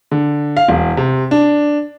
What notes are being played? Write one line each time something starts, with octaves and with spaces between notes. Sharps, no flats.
D3
F5
E1
C3
D4